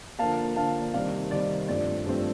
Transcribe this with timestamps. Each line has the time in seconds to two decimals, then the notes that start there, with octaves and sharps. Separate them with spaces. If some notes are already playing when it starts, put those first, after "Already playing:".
0.19 D3 F3 A#3 F5 A5
0.56 D3 F3 A#3 F5 A5
0.93 C3 D#3 G3 C4 D5 F5
1.31 C3 D#3 G3 C4 D5
1.68 G2 F3 A3 C4 D5
2.06 G2 F3 A3 C4